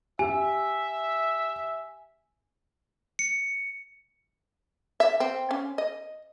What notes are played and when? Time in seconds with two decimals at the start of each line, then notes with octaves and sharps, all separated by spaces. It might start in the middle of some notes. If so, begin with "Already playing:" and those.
0.19 G4 E5 G#5
3.19 C#7
5.00 E5
5.20 C4
5.51 C#4
5.78 D#5